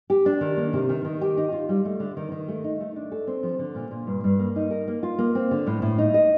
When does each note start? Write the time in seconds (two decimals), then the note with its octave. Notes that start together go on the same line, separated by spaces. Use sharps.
0.10 G4
0.26 D4
0.41 D#3
0.57 A#3
0.73 C3
0.89 D#3
1.05 D#3
1.21 G4
1.37 D#4
1.52 F4
1.69 G3
1.85 A3
2.00 D3
2.17 D#3
2.32 D#3
2.48 A3
2.64 D#4
2.81 A3
2.96 D4
3.12 A4
3.27 C4
3.43 F3
3.59 D3
3.75 A#2
3.91 A#2
4.07 G2
4.24 G2
4.39 A#3
4.56 D#4
4.71 A#4
4.88 A#3
5.03 F4
5.18 A#3
5.35 C4
5.51 D3
5.67 A2
5.82 A2
5.98 D#4
6.14 D#5